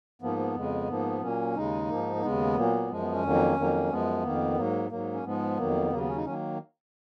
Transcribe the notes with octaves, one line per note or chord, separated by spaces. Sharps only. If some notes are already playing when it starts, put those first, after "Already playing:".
G#2 F3 A#3 B3
B3
F2 C#3 G#3
G#2 F3 A#3
A#2 F#3 A#3 C#4
D#2 C#3 G#3 D#4
G#2 F3 A#3
A#3
D#2 C#3 G#3 B3
A#2 F#3 A#3
F#2 F3 G#3
B3
C#4
F2 D#3 F#3 A#3
F2 D#3 F#3 A#3
F#2 F3 G#3 B3
F2 D#3 A#3
G#2 F#3 A#3
G#2 F#3 A#3
C#4
G#2 F3 G#3 B3
F2 D#3 F#3 A#3
D#2 C#3 F#3 A#3
B3
C#4
D#4
D#3 F#3 A#3 C#4